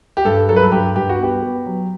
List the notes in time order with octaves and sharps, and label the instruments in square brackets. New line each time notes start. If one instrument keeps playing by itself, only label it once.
[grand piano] G4
G2 A4
F#3 A4
B4
A4
G2 G4
G2 G4
F#4
B3 G4
B3
F#3